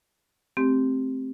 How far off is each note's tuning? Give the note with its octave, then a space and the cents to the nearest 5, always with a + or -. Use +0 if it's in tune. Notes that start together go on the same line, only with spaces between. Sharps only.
A3 -20 C4 +0 G4 +0